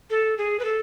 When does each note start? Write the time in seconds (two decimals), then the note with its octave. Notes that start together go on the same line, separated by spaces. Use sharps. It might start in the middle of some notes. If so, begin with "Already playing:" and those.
0.10 A4
0.38 G#4
0.59 B4
0.65 A4